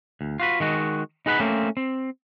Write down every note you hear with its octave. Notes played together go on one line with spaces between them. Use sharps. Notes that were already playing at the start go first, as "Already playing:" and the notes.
D2
F4 F#4 B4
D#3 G#3 F#4
D#4 G#4 B4 F#5 B5
A3 A#3 C4 C#4
C4